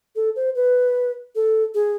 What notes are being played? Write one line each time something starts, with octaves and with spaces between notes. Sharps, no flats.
A4
C5
B4
A4
G#4